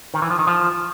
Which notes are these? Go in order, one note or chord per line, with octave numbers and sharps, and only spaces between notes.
D#3
E3
F3
D#3
F3